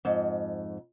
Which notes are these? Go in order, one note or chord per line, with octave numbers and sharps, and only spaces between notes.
F2 G#2